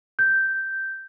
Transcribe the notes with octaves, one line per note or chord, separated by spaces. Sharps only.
G6